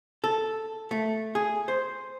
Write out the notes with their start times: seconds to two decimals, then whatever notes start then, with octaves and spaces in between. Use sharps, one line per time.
0.24 A4
0.91 A3
1.35 G#4
1.68 C5